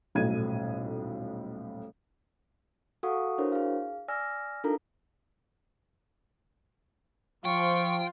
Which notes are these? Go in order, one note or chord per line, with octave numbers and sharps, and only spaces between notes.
D#1 B1 A2 G#6 D#7
F#4 A4 F5 F#5 C#6 D#6
D4 E4 F#4 A#4 C5 C#5
G#4 F5
D5 G#5 E6 F6 A#6
D4 D#4 F4 A4 A#4 A#5
F3 F4 G5 C#6